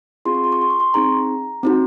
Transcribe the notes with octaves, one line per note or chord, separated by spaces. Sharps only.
C4 F4 G#4 C6
C#6
C6
C#6
C6
C#6
C6
C4 D#4 G#4 A#5
C4 D#4 F#4